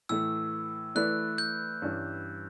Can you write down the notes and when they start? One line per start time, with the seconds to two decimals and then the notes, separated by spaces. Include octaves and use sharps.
0.09 A2 E3 A3 E6
0.95 E3 A3 E4 B4 D5 F#6
1.38 G6
1.82 G2 E3 G3 C#4